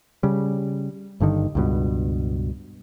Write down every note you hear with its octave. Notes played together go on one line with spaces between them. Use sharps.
C#3 G3
G1 G2 D3 D#3
C#2 G2 B2